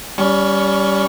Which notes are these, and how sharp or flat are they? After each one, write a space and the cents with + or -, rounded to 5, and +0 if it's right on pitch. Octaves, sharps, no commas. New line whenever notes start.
G3 +0 C#4 +25 C#6 +0